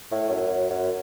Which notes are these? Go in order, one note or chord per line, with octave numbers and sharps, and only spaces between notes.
A2
F#2
F#2
F#2